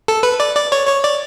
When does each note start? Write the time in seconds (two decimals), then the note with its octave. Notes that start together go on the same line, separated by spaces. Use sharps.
0.08 A4
0.23 B4
0.40 D5
0.56 D5
0.72 C#5
0.87 C#5
1.04 D5